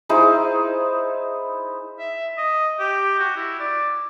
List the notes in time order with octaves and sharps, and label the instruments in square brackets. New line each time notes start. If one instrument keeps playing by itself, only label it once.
[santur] D#4 E4 G#4 C5
[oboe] E5
D#5
G4
F#4
E4
D5